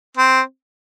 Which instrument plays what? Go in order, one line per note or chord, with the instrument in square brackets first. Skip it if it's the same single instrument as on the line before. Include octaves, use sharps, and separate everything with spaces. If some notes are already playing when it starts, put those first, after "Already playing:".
[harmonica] C4